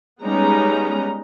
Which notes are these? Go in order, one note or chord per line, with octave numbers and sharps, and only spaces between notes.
G3 G#3 B3 C#4 D#4 A#5